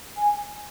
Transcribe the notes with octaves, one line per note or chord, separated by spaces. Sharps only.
G#5